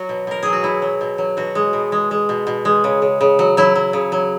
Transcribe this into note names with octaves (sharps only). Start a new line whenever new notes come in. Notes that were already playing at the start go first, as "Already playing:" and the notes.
Already playing: F#3 F#4
B2
B2 A#4
F#3 G#4
F#4
B2 E4
F#3
B2
F#3
B2 F#4
G#3
B2
G#3
G#3
B2
B2
G#3
C#3
C#3
C#3
F#3
F#3 E4
F#3
C#3
F#3